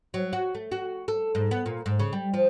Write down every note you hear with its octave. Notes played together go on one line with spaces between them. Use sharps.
F#3
F#4
A3
F#4
A4
G#2
B3
A#2
G#2
C#3
G3
F3